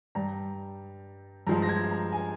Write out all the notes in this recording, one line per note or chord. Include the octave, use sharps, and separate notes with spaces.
G2 G3 A#5
G2 F3 G#3 A#5
A#6
G#6
A#5
G#5